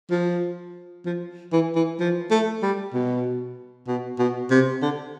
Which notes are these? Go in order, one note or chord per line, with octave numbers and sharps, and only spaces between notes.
F3
F3
E3
E3
F3
A3
G3
B2
B2
B2
C3
D3